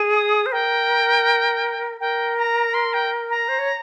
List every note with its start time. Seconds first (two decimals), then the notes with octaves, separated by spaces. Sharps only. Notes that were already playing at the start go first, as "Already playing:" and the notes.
Already playing: G#4
0.14 D#6
0.46 C5
0.52 A#4 G5
2.00 A#4 G5
2.37 A#5
2.74 C6
2.93 G5
3.30 A#5
3.48 C5
3.59 C#5